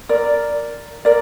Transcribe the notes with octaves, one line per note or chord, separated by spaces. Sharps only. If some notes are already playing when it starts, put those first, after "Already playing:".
A#4 D5
A#4 D5